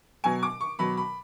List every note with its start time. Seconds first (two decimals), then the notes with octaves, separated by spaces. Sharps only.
0.24 B2 F#3 G#5
0.43 D6
0.61 C#6
0.79 B2 F#3 B5
0.97 B5